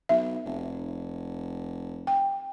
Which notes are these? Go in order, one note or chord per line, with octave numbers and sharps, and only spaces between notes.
B1 E5
F1
G5